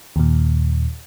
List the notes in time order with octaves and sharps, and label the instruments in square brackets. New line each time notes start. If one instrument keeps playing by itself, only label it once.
[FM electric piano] D#2 A#2